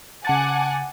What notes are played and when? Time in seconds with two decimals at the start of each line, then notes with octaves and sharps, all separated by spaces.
0.25 C#3 F#5 G#5 A5 D6 A6